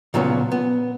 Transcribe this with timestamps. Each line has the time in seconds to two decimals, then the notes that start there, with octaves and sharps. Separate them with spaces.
0.14 A#2 C#3 F3 F#3 B3
0.52 B3